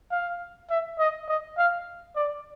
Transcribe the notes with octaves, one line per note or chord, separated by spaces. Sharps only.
F5
E5
D#5
D#5
F5
D5